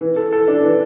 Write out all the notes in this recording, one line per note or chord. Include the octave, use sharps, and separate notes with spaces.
E3
A4
A4
D4
E3